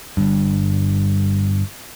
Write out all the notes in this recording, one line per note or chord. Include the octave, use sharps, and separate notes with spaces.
G1 G2